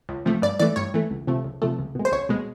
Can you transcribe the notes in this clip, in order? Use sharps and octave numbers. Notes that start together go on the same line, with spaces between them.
C#2
C3 F3 A3
G2 D5
E3 A3 D5
G2 C#5
E3 A3
C#2
C3 F3 A3
C#2
C3 F3 A3
C#2
B2 G#3
C5
C#2 C#5
B2 G#3